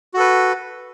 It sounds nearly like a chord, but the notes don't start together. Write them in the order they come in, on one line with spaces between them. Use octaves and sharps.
F#4 A4 B4